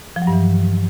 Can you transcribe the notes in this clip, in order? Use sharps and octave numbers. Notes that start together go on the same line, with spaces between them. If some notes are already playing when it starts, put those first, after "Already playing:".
F3
F#3
G2
E3